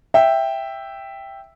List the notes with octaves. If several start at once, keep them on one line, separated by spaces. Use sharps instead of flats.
E5 G5